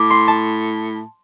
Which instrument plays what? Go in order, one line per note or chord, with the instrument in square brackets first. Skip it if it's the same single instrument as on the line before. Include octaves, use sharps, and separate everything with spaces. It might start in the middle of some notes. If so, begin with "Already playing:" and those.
Already playing: [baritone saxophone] A2 [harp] D6
[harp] C6
A5